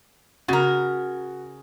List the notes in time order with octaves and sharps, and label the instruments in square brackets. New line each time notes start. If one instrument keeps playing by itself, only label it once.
[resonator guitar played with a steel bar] C#3 A#4 [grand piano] F#4